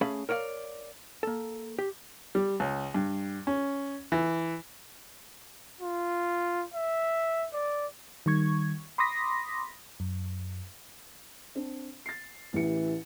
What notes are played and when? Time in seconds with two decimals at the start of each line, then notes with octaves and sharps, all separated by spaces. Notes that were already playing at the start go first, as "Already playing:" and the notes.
0.01 A3 C#4 G#4 F5 B5
0.29 A#4 C#5 D5 F5
1.23 A#3 A4
1.79 G4
2.35 G3
2.60 C#2
2.94 G2
3.47 C#4
4.12 E3
5.81 F4
6.74 E5
7.53 D5
8.26 D#3 G3 C#6 G#6
8.98 B5 C6 D6 D#6 A#6 B6
10.00 F#2
11.55 C4 D4
12.06 A6 C7
12.54 A1 E3 G4 C#7